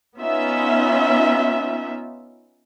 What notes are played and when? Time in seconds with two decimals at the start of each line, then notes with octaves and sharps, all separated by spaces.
0.20 B3 C#4 D#4 F4 E5